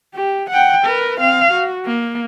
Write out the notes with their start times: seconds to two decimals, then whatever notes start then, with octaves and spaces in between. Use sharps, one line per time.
0.15 G4
0.50 F#5 G5
0.86 A#4 B4
1.20 C4 F5
1.52 F#4
1.86 A#3